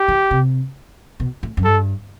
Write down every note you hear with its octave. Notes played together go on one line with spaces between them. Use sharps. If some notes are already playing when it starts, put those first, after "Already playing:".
Already playing: G4
E3
C3
B2
A2
F#2
G2 A4